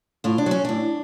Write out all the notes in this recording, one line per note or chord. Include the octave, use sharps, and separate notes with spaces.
A2 F4
D4
F#3 C#4
A2 D4